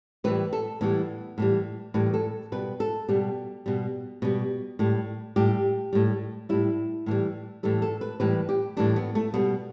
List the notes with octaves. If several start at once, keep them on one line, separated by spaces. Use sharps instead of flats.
A2 E3 G3 B4
A4
A2 E3 G3 B3
A2 E3 G3
A2 E3 G3 B4
A4
B2 G3 B4
A4
B2 G3 G4
B2 G3
B2 G3
A2 G3
A2 G3 G4
A2 G3
A2 G3 E4
A2 E3 G3
A2 E3 G3 A4
A4
B4
A2 E3 G3 B4
G4
A2 E3 G3 D4
B3
A3
B2 G3 B3